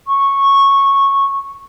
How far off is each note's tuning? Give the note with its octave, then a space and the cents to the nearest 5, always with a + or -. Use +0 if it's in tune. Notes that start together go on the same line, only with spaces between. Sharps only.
C#6 -10